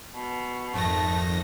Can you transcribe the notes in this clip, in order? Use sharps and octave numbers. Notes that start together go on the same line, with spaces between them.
B2
G#1 F2 A3 A#6